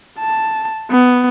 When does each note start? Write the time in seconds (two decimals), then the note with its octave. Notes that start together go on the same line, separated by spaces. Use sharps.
0.19 A5
0.91 B3